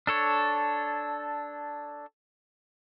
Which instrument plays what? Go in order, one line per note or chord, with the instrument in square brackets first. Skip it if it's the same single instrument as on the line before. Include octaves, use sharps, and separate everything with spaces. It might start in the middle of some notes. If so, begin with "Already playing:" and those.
[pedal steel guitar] D4 A4 C#5